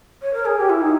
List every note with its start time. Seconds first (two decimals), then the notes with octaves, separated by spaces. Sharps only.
0.22 C#5
0.33 A#4
0.45 G#4
0.58 G4
0.69 E4
0.81 D#4